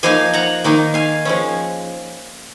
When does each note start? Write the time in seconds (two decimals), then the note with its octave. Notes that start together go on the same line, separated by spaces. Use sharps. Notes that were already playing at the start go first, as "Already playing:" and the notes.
0.03 F3 A#3 D#4 F5 G#5
0.33 F#5 A#5
0.64 D#3 A#3 D#4
0.94 F5 G#5
1.25 F3 G#3 C#4